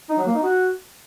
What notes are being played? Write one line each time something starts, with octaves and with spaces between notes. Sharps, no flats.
D#4
F#3
A#3
D#4
F#4